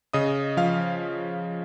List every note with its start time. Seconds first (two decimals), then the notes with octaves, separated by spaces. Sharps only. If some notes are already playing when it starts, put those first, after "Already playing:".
0.13 C#3 D#5 D#6
0.57 F3 F5 F6